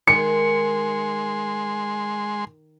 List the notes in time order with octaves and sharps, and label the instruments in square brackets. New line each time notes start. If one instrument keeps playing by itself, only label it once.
[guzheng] D#3 [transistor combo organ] G#3 C6 [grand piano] C#7